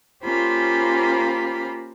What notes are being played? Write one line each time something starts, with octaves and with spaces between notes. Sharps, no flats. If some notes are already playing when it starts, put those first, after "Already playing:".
A#3 C#4 F4 G4 C5 B5